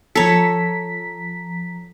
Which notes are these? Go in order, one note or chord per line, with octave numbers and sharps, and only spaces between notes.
F3 A4 C#5 A#5 B6